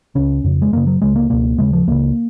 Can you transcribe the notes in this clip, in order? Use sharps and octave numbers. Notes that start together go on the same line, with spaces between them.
C#2 C#3 C#4
F2 C#3
G#3
F#2 C#3 A#3
F#3
C#2 C#3 G#3
A#3
C#2 B2 A#3
D#2 C#3 G#3
F3
C#2 C#3 A#3